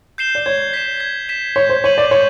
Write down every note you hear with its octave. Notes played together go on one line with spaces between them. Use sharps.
G6 C7 E7 G7
D5
C#5 G#6
B6 E7
G#6
B6 E7
C#5 G6
C5
C#5 B6 D#7 F#7
D5
C#5 G6